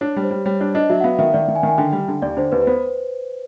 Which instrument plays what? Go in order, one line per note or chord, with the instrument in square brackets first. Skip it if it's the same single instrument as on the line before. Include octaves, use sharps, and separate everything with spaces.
[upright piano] D4 [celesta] C#5
[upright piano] G3
[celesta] C5
[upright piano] G3
[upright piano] G3 [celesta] C#5
[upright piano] D4 [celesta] D5
[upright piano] D4 [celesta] D#5
[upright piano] F#3 [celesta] E5
[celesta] F#5
[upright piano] B3 [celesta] F5
[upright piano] D#3 [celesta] E5
[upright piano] D#3 [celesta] D5
[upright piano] D#3
[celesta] G#5
[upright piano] D#3
[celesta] G#5
[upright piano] D3 [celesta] G5
[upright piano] G3
D3
[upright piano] D#2 [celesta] D5
[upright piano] D3 [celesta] C5
[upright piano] D#2 [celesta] B4
[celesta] B4
[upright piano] B3 [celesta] C5